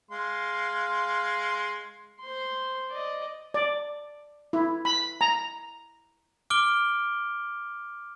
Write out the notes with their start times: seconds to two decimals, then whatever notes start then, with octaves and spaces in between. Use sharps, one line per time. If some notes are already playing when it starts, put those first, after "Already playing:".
0.11 G#3 F5 C6
2.20 C5 C6
2.91 D5 D#5
3.54 D5
4.53 E4
4.85 B5
5.21 A#5
6.50 D6 F6 D7 G7